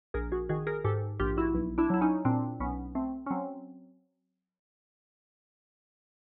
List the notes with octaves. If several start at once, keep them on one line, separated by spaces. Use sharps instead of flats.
A#1 G#4 A#4
F#4 G#4
D#3 F#4 G#4
G#4 A#4
G#2 G4 A4
A#1 F4 G4
E4 F#4
B1
D4 E4
F#3 E4
C#4 D#4
A#2 C4 D4
B1 B3 C#4
A3 C4
C#4
F#3 C4